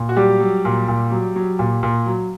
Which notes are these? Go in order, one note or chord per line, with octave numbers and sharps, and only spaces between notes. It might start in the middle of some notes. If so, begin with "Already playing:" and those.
Already playing: A#2
F#4
F#3 G3 G4
F#3
A#2
A#2
F#3
F#3
A#2
A#2
F#3